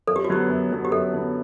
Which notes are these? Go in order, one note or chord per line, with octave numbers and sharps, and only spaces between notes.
F#2 A4
G4
F#4
D3 F#3 B3 G4
F#2
D3 F#3 B3
G4
F#2 A4
D3 F#3 B3